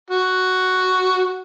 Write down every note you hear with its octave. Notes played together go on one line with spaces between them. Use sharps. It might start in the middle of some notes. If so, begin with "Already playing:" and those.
F#4